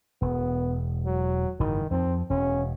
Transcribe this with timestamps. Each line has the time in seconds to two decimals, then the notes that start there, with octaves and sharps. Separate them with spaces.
0.22 E1 B3
1.06 F#3
1.60 F#1 G#2 D#3 E3
1.91 F2 F3 C4
2.30 E1 C#4